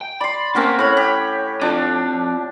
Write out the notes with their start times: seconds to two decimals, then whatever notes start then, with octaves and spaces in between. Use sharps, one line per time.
0.01 G5
0.21 D5 B5 C6
0.55 A#3 C4 C#4 F#4 A#4
0.79 A2 C#5 B5
0.97 G4
1.61 C4 D4 F4